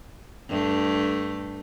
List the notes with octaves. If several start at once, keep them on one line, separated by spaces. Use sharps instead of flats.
G2 A3